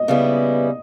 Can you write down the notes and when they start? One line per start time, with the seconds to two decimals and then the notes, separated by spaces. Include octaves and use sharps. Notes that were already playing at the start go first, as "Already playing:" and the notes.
Already playing: D#5
0.08 C#3 G3 B3 E4